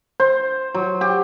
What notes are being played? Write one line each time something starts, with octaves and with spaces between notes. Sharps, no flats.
C5
F#3
G4